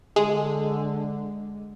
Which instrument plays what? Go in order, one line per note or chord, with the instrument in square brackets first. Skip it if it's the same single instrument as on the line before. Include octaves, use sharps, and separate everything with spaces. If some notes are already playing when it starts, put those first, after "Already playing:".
[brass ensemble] D3 [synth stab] G#3